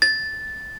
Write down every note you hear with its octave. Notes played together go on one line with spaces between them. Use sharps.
A6